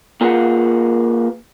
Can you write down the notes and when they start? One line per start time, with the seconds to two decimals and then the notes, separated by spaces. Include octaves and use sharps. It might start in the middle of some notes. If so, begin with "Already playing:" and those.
0.21 A#3 F4 G#4 A#4 B4 F#5